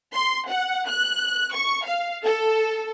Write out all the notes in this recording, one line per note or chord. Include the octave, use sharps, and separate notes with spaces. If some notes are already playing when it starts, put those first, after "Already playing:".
C6
F#5
F#6
C#6
F5
A4